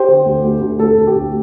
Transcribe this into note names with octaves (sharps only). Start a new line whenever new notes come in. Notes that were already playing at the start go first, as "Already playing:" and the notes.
Already playing: G4 C5
D3
D2
D2
D2
D2 A4
D2
G4
D2